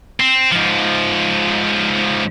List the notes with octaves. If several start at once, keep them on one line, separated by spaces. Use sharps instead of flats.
C4
G#2 F3